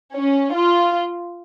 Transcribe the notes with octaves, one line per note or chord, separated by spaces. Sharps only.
C#4
F4